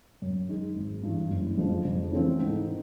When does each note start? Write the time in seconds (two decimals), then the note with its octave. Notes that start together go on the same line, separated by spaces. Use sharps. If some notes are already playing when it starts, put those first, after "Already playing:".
0.22 F#2
0.49 D#3 G#3
0.76 G#1
1.03 G2 E3
1.30 F#1
1.58 F2 D3 F3 G#3
1.85 F2
2.12 C#3 E3 A3 C4
2.39 G#2
2.66 D#3